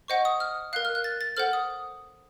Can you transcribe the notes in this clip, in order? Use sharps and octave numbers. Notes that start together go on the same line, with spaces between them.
C5 D#5 F#5 C#6
D#6
F6
A#4 F5 F#6
F6
F#6
A6
A6
A4 C5 F#5 F6
D#6